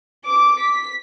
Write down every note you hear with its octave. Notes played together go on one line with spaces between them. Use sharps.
D6 D7
B6